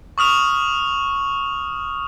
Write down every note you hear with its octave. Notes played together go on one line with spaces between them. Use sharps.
C#6 D#6 F6 F7